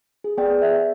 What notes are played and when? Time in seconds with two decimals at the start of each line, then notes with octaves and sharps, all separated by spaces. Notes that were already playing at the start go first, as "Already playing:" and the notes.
0.24 G#4
0.38 B3 G#4 D5 G5
0.62 E5